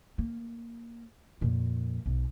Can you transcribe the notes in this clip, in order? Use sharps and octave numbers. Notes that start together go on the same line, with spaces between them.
A#3
F2 A#2
B1